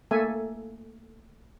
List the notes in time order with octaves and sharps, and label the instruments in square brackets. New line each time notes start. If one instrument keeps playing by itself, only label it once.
[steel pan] A3 A#3 A4 E5 G#5